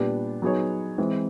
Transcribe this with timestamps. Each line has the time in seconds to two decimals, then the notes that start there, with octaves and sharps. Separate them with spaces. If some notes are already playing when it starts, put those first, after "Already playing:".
Already playing: A#2 G3 B3 D4 G4
0.42 F#3 B3 D#4 G#4 C#5
0.98 E3 G#3 C4